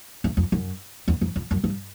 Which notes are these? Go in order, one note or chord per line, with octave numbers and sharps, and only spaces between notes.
E2
F2
F#2
E2
F2
F2
F#2
G2